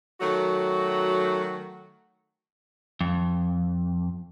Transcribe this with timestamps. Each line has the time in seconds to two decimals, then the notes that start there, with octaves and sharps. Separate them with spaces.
0.20 D#3 F#3 A3 F#4
3.01 F2